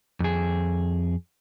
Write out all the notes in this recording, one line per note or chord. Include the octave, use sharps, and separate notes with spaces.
F2 G#4